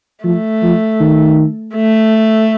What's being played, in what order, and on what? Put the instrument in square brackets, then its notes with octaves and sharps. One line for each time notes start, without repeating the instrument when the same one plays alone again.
[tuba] F3 [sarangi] A3
[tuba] F3
D#3
[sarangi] A3